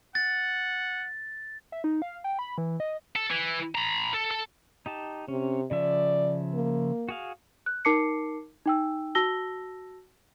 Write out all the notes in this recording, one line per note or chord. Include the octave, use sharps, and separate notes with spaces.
F#5 A6
E5
D#4
F5
G5
B5
E3
D#5
A4
E3
A#5 B5
A4
A4
D#4 G4 A5
C3 C#4
C#3 F3 D5 E5
A#3
F#4 G#4 F5
F#6
D#4 A#4 A5 D6 C7 C#7
D#4 G5 E6
F#4 A5 E6 A#6 G7